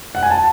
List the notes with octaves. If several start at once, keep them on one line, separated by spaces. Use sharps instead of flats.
F#5
G#5
A5